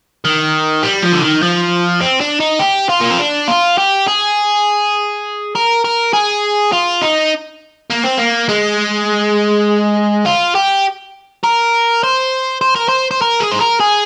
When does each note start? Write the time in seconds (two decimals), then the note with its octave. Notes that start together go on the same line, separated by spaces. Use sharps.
0.25 D#3
0.83 G3
1.02 F3
1.13 D3
1.22 D#3
1.43 F3
2.01 C4
2.21 D4
2.40 D#4
2.60 G4
2.89 F4
3.01 A#3
3.10 C4
3.19 D4
3.48 F4
3.78 G4
4.07 G#4
5.55 A#4
5.84 A#4
6.13 G#4
6.72 F4
7.02 D#4
7.91 A#3
8.04 C4
8.18 A#3
8.49 G#3
10.26 F4
10.55 G4
11.44 A#4
12.04 C5
12.61 C5
12.76 A#4
12.89 C5
13.11 C5
13.22 A#4
13.40 G#4
13.51 C5
13.60 A#4
13.80 G#4